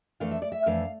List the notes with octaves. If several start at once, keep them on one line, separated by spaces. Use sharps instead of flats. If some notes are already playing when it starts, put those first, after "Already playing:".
F2 E3 A3 D4 F5
E5
D5
E5
F2 E3 A3 D4 F5